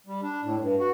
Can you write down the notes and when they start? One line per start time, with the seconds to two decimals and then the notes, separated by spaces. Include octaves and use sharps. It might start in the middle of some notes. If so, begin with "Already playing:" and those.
0.07 G3
0.22 D4
0.43 A2
0.61 G2
0.80 F#4